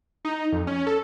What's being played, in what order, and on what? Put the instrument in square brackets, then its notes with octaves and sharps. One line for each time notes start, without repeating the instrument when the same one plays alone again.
[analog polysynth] D#4
F2
C#4
A4